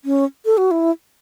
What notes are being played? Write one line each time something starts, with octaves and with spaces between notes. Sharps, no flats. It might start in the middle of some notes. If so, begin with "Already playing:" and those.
C#4
A4
F#4
E4